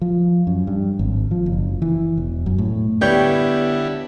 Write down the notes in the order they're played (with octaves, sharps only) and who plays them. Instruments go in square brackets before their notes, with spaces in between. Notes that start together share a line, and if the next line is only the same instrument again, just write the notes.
[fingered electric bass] F3
F#2
G2
G#1
F3
F#1
E3
E1
F#2
A2
[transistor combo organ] D3 E4 [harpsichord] G3 C#5 C#6 [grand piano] B3 G5 G6